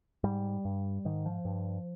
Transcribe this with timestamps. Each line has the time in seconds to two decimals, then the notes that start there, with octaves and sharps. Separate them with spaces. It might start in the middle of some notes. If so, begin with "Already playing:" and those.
0.24 G#2 G3
0.65 G2
1.05 G#2 D#3
1.26 F3
1.45 G2